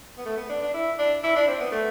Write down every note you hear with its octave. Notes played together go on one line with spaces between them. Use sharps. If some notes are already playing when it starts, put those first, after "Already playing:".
B3
A3
B3
D4
D4
E4
D4
E4
D4
C4
B3
A3